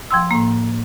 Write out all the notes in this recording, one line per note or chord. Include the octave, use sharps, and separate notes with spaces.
F3 G5 C6 E6
A2 A#3